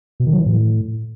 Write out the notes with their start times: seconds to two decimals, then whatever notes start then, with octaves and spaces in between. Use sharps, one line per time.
0.20 B2
0.26 D#3
0.33 F#3
0.39 E3
0.46 A2